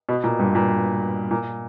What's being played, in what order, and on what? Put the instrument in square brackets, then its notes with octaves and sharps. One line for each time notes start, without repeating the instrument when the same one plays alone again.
[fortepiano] B2
A#2
G2
A#2
A#2